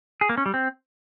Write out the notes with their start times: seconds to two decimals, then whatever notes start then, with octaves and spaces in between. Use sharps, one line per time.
0.21 G#4
0.29 A#3
0.38 C#4
0.46 G3
0.54 C4